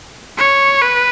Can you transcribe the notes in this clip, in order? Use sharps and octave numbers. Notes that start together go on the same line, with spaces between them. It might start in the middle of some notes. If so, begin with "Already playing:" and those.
C#5
B4